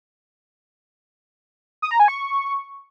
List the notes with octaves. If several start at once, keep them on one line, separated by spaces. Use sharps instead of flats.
D#6
A#5
G#5
C#6